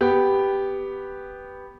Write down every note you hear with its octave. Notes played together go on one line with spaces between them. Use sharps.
B3 G4